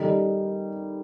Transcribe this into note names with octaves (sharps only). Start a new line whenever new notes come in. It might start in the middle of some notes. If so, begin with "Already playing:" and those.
Already playing: D#3 G3 D#4 A4